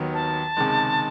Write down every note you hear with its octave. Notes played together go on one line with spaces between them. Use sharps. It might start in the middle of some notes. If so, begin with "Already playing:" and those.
Already playing: D#2 D#3 F#3 B3
A5
C#2 C3 D#3 G#3